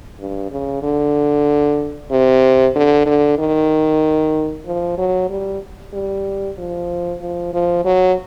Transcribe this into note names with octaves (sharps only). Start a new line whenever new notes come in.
G2
C#3
D3
C3
D3
D3
D#3
F3
F#3
G3
G3
F3
F3
F3
F#3